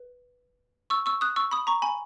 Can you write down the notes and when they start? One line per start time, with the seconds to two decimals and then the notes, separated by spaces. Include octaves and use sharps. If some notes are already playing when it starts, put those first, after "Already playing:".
Already playing: B4
0.90 C#6 E6
1.06 C#6 E6
1.21 D#6 F#6
1.36 C#6 E6
1.51 B5 D#6
1.67 A#5 C#6
1.82 G#5 B5